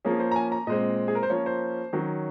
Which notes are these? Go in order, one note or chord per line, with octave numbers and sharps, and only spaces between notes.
F3 A#3 C#4 G#4
C5
A#5
G#5
A#5
A#2 G#3 C4 D#5
G#4
A#4
C5
F3 A#3 C#4 C#5
C5
D#3 F#3 C#4